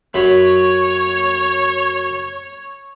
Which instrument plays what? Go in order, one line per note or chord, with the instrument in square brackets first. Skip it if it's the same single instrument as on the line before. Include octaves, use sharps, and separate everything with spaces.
[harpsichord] F#2 B5 [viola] C#5